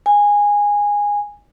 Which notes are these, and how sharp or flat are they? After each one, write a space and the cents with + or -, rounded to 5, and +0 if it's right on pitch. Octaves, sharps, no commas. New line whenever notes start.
G#5 -15